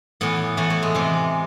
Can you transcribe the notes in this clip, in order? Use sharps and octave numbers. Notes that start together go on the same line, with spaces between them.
A2 E3 B3
A2 E3 A3
A3
G#3
C3 E3